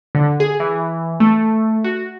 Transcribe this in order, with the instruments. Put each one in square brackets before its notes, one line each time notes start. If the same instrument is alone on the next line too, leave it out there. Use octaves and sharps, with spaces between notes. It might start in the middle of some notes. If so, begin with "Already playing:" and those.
[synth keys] D3
G#4
E3
A3
F#4